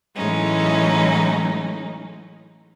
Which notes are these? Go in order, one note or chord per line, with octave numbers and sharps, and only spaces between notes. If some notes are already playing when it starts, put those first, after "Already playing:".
A2 E3 F#3 G#3 C#4 D#4